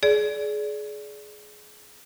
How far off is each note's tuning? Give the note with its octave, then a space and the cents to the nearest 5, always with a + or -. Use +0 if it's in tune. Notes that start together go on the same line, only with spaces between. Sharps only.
G#4 +25 D5 -15